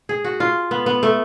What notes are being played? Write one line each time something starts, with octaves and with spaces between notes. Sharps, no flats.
G#4
F#4
F4
B3
B3
A3